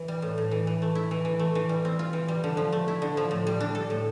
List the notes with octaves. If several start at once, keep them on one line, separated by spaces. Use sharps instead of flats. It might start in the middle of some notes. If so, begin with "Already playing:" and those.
Already playing: E3
G3
A2
A2
E3
E3
A3
E4
E3
E3
A3
E3
G3
C4
F4
E3
G3
D3
F3
A3
E4
D3
F3
A2
G3
D4
A4
A2